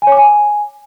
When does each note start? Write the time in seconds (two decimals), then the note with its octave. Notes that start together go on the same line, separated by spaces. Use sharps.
0.02 G#5
0.07 C#5
0.12 D6
0.17 G#5